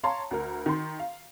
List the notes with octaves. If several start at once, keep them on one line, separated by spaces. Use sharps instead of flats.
C#5 F5 A5 A#5 C6
D2 A#4
D#3 C6
F5